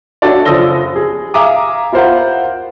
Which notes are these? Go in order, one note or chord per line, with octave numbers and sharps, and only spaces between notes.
D4 F#4 A4 C#5 D5
F#1 F3 D#6 E6 A#6 G7
G#4
E5 F5 G#5 A#5 D6 D#6
E4 F4 A#4 C5 F5 F#5